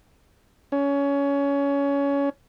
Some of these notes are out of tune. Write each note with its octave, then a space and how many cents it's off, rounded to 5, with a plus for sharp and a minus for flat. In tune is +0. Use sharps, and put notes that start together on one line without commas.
C#4 +20